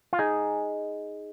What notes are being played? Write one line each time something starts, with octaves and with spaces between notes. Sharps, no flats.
F4
D#4 G#4